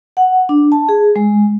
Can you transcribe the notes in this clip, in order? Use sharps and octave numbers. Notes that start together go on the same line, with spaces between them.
F#5
D4
A5
G#4
G#3